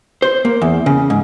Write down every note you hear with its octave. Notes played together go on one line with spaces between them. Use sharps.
C5
A#3
E2
C#3
G#2